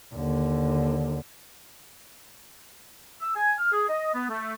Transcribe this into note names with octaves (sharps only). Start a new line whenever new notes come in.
D#2 D3
E6
G#5
F6
G#4
D#5
B3
A3